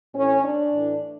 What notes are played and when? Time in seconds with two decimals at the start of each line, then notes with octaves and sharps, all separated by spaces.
0.14 A2 E3 C#4
0.44 D4
0.73 A2 E3